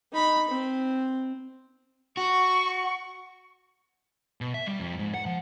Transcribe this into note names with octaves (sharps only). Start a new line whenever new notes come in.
D#4 B5
C4
F#4 C#6
B2
E5
G3
F2
G#2
F#5
F3